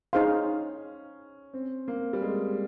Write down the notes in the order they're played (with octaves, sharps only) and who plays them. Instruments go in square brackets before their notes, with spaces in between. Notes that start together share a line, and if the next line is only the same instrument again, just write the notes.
[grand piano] C#4 [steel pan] D#4 G#4 C5 F5 C6
[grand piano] C4
A#3
G3
G#3